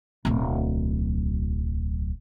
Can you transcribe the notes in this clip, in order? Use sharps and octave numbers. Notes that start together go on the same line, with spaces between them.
D1 B1